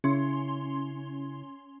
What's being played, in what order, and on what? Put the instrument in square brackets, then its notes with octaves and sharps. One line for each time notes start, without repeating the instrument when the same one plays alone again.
[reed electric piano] C#3 E4 [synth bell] C#4 C6